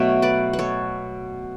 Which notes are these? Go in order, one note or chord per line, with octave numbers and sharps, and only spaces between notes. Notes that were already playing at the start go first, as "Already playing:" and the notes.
Already playing: B2 F#3 A3 C#5 E5
B4 D5
B4
A4 C#5